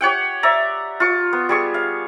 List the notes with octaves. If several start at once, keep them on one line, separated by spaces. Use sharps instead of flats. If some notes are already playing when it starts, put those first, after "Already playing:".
G4 C#5 F#5 G5
D5 E5 A#5
F4 C#6
B3
G3 G#4 C#6
F5